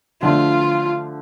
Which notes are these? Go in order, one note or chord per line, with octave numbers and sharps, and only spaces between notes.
D3 F3 A3 F4